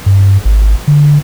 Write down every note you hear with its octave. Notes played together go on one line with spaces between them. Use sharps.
G2
G#1
D3